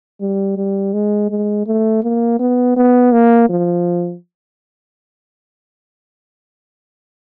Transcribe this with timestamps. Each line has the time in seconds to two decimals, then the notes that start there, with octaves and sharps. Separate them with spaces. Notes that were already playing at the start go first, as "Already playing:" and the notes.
0.21 G3
0.57 G3
0.93 G#3
1.30 G#3
1.67 A3
2.03 A#3
2.39 B3
2.77 B3
3.12 A#3
3.49 F3